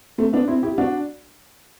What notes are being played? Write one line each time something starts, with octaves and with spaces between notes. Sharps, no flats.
A3 C4
B3 D4
C4 E4
E4 G4
D4 F#4